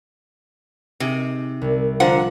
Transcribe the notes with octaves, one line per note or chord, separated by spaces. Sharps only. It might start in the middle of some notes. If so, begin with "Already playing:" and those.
C3 D#4 G#4
C2 G3
D3 F3 A#4 F#5 E6